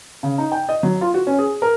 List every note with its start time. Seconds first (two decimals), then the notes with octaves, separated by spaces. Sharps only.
0.23 C#3
0.38 D#4
0.52 G5
0.69 D#5
0.83 F#3
1.01 F4
1.14 F#4
1.27 C#4
1.39 G#4
1.62 A#4